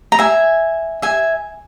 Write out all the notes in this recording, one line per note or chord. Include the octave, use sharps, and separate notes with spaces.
A#5
E5 G#5
E5 G#5